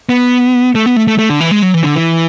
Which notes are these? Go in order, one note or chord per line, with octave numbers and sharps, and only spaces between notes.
B3
A3
B3
A3
A3
A3
D3
E3
G#3
F#3
E3
D3
E3